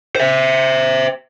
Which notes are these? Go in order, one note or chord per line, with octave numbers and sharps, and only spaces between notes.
C5 E5